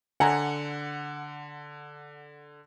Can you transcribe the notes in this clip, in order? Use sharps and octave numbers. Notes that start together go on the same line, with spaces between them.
D3 F#5 G#5 A#5 C#7